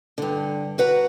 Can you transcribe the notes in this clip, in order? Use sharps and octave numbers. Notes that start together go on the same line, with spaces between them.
G2 D3
F#4 B4 F#5 A#5